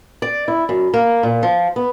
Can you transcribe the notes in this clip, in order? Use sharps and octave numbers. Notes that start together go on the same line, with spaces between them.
D5
E4
F#2
A#3
A#2
F3
B3